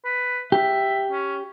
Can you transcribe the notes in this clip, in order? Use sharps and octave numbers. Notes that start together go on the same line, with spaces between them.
B4
G4 E5
C#4